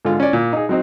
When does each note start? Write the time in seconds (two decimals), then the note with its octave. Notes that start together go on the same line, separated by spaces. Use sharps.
0.05 G#2 D3 F4
0.20 C#4 D5
0.33 A#2
0.53 D#4 G#4
0.69 F#3 C4 D#4